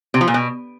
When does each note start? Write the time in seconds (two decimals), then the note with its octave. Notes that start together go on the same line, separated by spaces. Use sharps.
0.14 C3
0.21 F3
0.27 A#2
0.34 B2